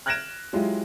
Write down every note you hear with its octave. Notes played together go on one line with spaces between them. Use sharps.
F6 F#6 G#6 A#6 D7 E7
F#3 G#3 E4 F4 G4